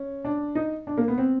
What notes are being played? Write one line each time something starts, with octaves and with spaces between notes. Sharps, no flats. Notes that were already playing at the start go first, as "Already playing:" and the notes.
Already playing: C#4
D4
D#4
D4
A#3
B3
C4